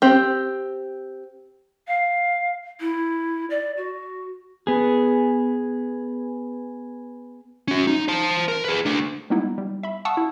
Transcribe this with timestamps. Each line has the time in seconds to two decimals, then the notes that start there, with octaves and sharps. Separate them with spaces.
0.02 C4 G4
1.88 F5
2.80 E4
3.50 D5
3.77 F#4
4.67 B3 G#4
7.68 C#4 F#4
7.87 D#4
8.08 C5 A5
8.48 A#4
8.65 G#4 B4
8.86 A3 D4
9.30 G3 G#3 A#3 B3 D#4 E4
9.58 G3
9.83 E5 B5
10.05 F5 F#5 A5 C#6 D#6 E6
10.17 E4